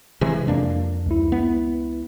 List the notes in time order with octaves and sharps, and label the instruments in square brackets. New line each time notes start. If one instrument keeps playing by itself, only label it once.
[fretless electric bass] C3 E3 G#3
F2 A#3 D4
[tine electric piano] C#2 E4
[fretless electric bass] B3